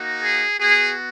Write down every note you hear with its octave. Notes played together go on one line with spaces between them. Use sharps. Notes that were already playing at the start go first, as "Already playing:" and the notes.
Already playing: A#3 D#4 F#4
G#4
B3 F#4 G#4